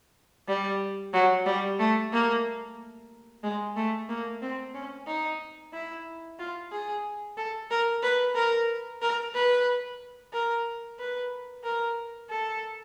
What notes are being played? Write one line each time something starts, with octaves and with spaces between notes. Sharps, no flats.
G3
F#3
G3
A3
A#3
G#3
A3
A#3
C4
C#4
D#4
E4
F4
G#4
A4
A#4
B4
A#4
A#4
B4
A#4
B4
A#4
A4